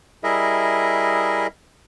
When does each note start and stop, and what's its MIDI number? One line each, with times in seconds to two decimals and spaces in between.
0.24 1.47 55
0.24 1.47 64
0.24 1.47 68
0.24 1.47 70
0.24 1.47 75
0.24 1.47 76